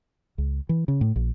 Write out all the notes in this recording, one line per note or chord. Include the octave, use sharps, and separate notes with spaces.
C#2
E3
C#3
A2
A#1